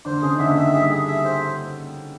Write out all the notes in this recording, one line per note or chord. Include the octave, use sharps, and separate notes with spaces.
D3 D4 C5
C#3 C#4 G#4
D#4
D3 D4 E5
D#3 D#4 E5
G3 G4 G#4
G#4
E5
C5